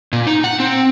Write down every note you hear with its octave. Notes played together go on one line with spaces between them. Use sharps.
A#2
D#4
F#5
C4